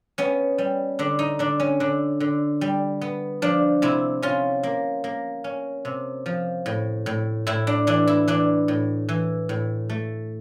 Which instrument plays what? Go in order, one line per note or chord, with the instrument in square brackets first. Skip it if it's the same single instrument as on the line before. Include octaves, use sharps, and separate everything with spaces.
[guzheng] B3 C#4
G3
D3 D4
D#4
D3 D4
C#4
D3 D4
D3
G3
B3
F3 D4
C3 E4
C#4 F4
A#3
A#3
C#4
C3
F3
A2
A2
A2 E4
D4
E3 D4
E4
E3 D4
A2
E3
A2
A3